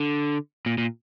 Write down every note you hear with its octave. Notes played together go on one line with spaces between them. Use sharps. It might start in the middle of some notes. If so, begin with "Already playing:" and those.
Already playing: D3
A#2
A#2